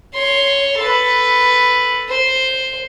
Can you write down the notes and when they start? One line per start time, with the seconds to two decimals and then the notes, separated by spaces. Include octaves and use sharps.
0.14 C#5 C6
0.80 A4 B4
2.09 C5